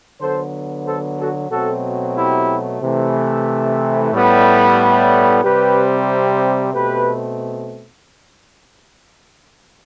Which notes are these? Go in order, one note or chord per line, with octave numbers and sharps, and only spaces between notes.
D3 F#3 B3 A4 C5
A4 C5
F#4 A4
B2 F#3 A3 C4 F#4 A4
E4 G4
C3 E3 A3
A2 G3 B3
C3 G3 C4 G4 B4
B2 A3 C4 G4 B4